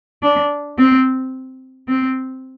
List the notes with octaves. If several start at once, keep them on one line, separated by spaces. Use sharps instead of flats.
D4
C4
C4